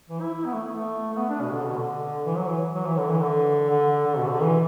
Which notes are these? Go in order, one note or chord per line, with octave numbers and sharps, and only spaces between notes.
E3
E4
E4
B3
A3
A3
A3
B3
D4
B2
D3
B2
D3
E3
F#3
E3
F#3
E3
D3
E3
D3
D3
D3
B2
D3
E3